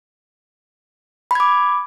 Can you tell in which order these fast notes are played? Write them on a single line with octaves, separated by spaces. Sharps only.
B5 G#6 D6